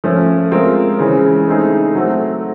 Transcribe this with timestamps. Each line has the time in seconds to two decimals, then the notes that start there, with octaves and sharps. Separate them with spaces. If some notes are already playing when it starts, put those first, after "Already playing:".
0.04 F3 A3 C#4
0.51 G#3 C4 F4 A#4
0.99 C#3 E3 G#3 C#4
1.48 A3 C4 D#4 G#4
1.95 F#3 A3 C4